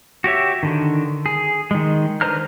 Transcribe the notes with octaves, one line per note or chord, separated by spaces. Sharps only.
F#4 G4 C#5 E5
D3 D#3
G#4
D#3 G#3
D3 B4 C5 A#5 F6